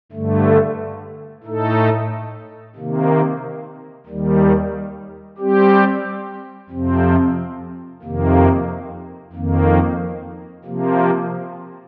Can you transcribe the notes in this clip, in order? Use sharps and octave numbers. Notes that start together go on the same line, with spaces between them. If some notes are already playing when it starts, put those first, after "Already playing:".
G2 D3 A3
A2 A3 D#4 A4
C3 D#3 A#3
D#2 D#3 G3
G3 C4 G4
F2 C3 F3 C4
F2 C3 D#3 A#3
F2 D#3 A#3
C3 F3 A#3